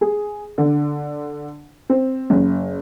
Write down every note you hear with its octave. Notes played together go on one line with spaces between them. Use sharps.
G#4
D3
C4
F#1